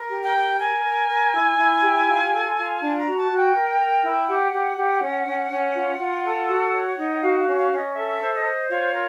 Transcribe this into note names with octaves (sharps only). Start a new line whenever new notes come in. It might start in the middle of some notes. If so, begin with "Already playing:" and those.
Already playing: A#4
G4
G5
A#4
A#4 G#5
A#4
A#4
E4
E4
G4
F4
A4
F4
D4 A5
A#5
F#4
A5
F#4
G5
A#4
A#4
E4
G4 F#5
G4
G4
C#4
C#4
C#4
F4
F4
A4
F#4
C#5
D#4
F#4 F5
F5
C#4
F5
C#4
D#5
A4 E5
C5
D#5
C5
F4 C#5
A#4